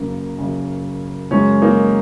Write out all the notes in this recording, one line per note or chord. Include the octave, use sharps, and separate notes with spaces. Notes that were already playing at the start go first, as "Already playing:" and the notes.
Already playing: F#2 C#3 A#3
F#2 C#3
F#2 C#3 G#3 C#4
A#3 D#4